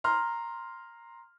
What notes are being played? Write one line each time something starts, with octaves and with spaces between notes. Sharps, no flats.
A#5 C6 F6